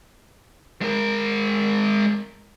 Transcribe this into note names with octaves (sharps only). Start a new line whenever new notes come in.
G#3 A#4